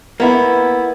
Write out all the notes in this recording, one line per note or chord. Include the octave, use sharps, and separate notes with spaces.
A#3 B3 E4